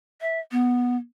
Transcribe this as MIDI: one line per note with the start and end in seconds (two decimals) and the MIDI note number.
0.21 0.40 76
0.52 0.96 59